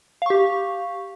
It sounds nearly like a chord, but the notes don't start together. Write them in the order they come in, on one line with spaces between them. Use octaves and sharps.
F5 C#6 G4